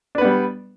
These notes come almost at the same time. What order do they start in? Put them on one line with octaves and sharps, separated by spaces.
D4 B4 B3 G3